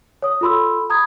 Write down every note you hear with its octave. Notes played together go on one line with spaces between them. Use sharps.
C#5 D#6
F4 A4 B5 C6 E6
A#5 B5 D#6 G#6